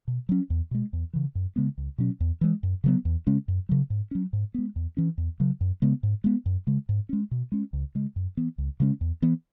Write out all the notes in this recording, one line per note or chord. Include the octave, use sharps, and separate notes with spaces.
B2
F#3 C#4
E2
B2 G#3
E2
C#3 E3
F#2
C#3 G#3 B3
C#2
B2 F#3 C#4
E2
E3 G#3
F#2
C#3 F#3 B3
E2
C#3 G#3 C#4
F#2
C#3 F#3
G#2
F#3 C#4
G#2
G#3 B3
E2
E3 C#4
E2
C#3 F#3
F#2
C#3 G#3 B3
G#2
G#3 B3
F#2
C#3 G#3
G#2
G#3 C#4
B2
G#3 C#4
C#2
C#3 G#3
F#2
E3 B3
C#2
C#3 G#3 C#4
E2
E3 B3